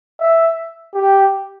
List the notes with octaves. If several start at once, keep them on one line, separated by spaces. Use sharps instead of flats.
E5
G4